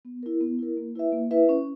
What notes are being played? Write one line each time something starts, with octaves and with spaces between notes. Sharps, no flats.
B3
E4 A#4
B3
E4 A#4
A#3
E4 B4 E5
A#3
E4 B4 E5
C#4